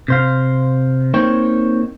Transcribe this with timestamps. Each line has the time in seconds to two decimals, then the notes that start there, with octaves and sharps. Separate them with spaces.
0.08 C3 C5 F5
1.14 A#3 C4 D#4 C5 C#5 G5